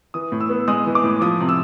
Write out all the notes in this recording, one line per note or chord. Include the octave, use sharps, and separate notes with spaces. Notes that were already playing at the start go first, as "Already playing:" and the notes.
E3 D#6
A2
E6
B3
G#3 D#6
E3
D6
A2
F3 D#6
C3
E6